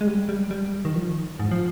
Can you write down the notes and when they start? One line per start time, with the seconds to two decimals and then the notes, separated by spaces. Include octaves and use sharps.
0.01 G#3
0.07 G3
0.29 G3
0.51 G3
0.85 D#3
0.95 F3
1.39 G#2
1.51 F3